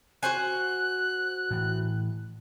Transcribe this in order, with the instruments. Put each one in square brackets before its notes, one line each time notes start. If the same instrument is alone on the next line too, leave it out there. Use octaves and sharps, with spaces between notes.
[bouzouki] F#4 C5 G#5 [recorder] F#6
[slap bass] A2 E3